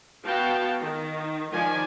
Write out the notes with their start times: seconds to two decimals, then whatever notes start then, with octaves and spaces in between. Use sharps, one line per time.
0.25 B3 F#4 F5 G5 A5
0.81 D#3
1.50 D#3 F3 D5 G#5